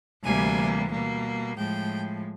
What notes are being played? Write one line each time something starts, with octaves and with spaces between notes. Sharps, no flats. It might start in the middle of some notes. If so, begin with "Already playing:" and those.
D2 C3 E3 G3 A#3 G#5
B2 G3 A#3
A2 F3 G#3 G5